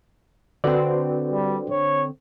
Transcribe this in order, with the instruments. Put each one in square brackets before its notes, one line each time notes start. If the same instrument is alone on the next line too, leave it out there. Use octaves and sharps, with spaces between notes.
[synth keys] D3 C4 [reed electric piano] F#4 B4 D5
[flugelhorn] G3
C#5